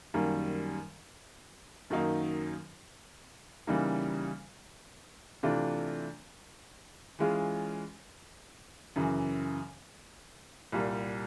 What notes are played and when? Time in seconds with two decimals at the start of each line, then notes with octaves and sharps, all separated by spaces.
0.14 F#2 D#3 G3 A#3
1.90 F#2 D#3 F#3 A#3 D#4
3.67 C#3 E3 G3 A#3 D#4
5.43 C3 E3 A3 D4 F4
7.19 E3 G#3 C#4 F4 G#4
8.96 F#2 C#3 E3
10.72 C2 A#2 G3